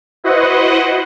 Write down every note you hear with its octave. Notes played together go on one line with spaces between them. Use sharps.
E4 F#4 B4 C5 D#5 F#5